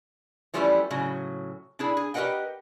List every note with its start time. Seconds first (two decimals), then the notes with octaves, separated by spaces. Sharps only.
0.54 E3 F3 G3 A3 C#4 E4
0.91 A2 C#3 F#3
1.79 D4 E4 G#4
1.97 G#4
2.14 G4 A#4 B4 D#5 F#5 G5